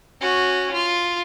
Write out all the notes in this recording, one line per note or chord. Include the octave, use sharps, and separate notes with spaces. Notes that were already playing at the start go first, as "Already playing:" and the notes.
C#4 F#4
F4